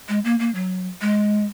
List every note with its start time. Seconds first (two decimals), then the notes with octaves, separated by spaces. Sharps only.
0.09 G#3
0.25 A#3
0.39 A#3
0.55 F#3
1.01 G#3